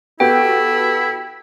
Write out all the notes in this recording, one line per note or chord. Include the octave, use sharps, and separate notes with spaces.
B3 E4 F#4 G4 A4 G5